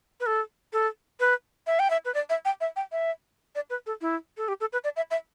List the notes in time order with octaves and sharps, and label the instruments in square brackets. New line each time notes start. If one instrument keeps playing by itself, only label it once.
[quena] B4
A4
A4
B4
E5
G5
E5
B4
D5
E5
G5
E5
G5
E5
D5
B4
A4
E4
A4
G4
A4
B4
D5
E5
E5